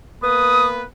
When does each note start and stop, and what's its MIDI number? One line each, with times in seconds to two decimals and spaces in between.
0.22 0.84 58
0.22 0.84 59
0.22 0.84 71
0.22 0.66 87